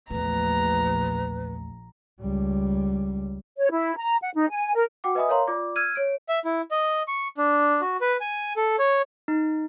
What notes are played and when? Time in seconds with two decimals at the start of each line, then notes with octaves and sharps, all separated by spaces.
0.10 A#1 E2 A3 B4 A#5
2.20 C#2 G3
3.58 C#5
3.71 E4
3.97 A#5
4.22 F#5
4.35 D#4
4.50 G#5
4.75 A#4
5.04 F#4 F#5 G5 D6
5.15 B4 D#5 E5 G#5 B5 D#6
5.29 A#4 C#5 F5 A#5 C6
5.47 F4 D5 D6
5.76 E6 F6 G#6 D#7
5.95 C#5 D7
6.29 E5
6.45 E4
6.71 D#5
7.08 C#6
7.37 D4
7.81 F#4
8.01 B4
8.21 G#5
8.56 A4
8.79 C#5
9.28 D#4